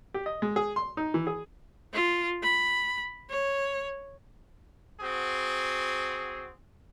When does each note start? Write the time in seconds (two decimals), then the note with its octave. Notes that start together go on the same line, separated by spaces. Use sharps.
0.14 G4
0.26 D#5
0.42 G#3
0.56 G#4
0.76 C6
0.97 D#4
1.14 E3
1.27 G#4
1.93 F4
2.43 B5
3.30 C#5
5.00 C4 F#4 G#4